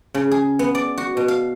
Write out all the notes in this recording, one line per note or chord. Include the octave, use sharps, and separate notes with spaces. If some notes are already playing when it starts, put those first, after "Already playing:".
C#3
G#4
B3
D5
F#4
B2
F5